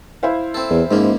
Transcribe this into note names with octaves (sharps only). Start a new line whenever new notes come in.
E4 C5 F5
C4 A4
E2
C#2 G#2 F3 A#3